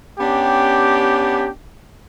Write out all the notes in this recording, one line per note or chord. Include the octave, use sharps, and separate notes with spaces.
B3 C#4 D4 G4